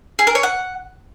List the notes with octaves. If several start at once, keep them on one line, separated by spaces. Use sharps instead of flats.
G#4
A#4
C#5
F#5